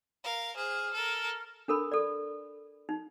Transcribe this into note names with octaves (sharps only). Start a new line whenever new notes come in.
A#4 F5
G#4 C5 F6
A4 A#4
D4 A4 A#4 B5
A4 D5
D#4